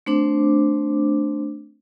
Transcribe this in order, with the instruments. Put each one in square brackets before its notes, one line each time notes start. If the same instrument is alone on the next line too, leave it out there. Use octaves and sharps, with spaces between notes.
[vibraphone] A3 C4 D4 C5 D6